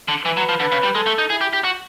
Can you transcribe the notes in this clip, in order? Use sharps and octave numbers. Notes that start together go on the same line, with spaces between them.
D3
E3 B4
F#3
F3
D3 B4
C#3
G3
G#3 A4
A3
D#4
E4 G#4
G4
G4
F#4